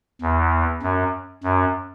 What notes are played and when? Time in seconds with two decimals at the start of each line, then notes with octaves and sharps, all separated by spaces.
0.22 E2
0.82 F#2
1.43 F#2